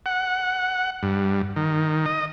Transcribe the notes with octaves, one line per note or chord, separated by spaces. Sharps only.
F#5
G2
D#3
D#5